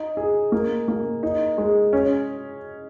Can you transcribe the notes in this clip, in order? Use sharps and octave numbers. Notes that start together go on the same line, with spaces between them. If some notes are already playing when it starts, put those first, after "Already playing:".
Already playing: D#4
G#4
A#3
A#3
D#4
G#3
C#4